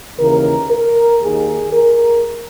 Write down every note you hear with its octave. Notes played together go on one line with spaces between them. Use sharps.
D#2 C#3 E3 A#4
A#4
D#2 D#3 G#4
A#4